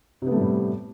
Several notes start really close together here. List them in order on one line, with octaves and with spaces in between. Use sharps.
C3 B3 A3 G3 A2